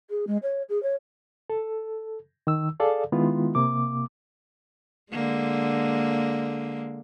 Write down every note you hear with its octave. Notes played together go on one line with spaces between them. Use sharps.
G#4
G#3
C#5
G#4
C#5
A4
D#3 E6
G#4 A4 D5 F5
D#3 G#3 B3 E4 F4
C3 A#3 D6
D3 G#3 A#3